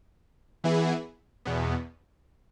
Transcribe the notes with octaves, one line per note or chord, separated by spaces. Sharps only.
E3 B3 E4 G#4
E2 B2 B3